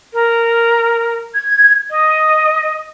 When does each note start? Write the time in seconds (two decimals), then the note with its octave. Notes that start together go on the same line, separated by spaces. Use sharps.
0.13 A#4
1.35 G#6
1.90 D#5